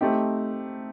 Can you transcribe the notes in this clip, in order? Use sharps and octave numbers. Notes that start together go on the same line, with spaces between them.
A3 C4 D#4 G4